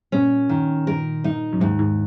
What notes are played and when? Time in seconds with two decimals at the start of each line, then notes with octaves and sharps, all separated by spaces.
0.12 A#2 C#4
0.49 D#3
0.87 A#4
1.24 D#4
1.53 F#2
1.60 D#2 G#2
1.79 G#2